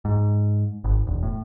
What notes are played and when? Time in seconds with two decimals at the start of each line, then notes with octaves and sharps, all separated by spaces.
0.05 G#2
0.84 G#1
1.07 E1
1.23 A2